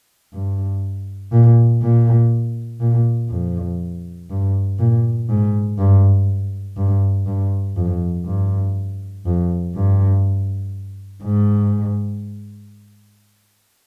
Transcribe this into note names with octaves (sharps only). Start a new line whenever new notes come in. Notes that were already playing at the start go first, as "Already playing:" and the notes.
G2
A#2
A#2
A#2
F2
G2
A#2
G#2
G2
G2
G2
F2
G2
F2
G2
G#2